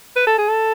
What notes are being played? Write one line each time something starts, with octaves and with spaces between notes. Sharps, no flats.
B4
A4
G#4
A4